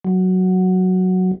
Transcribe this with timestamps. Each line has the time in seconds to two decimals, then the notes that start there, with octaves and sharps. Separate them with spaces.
0.05 F#3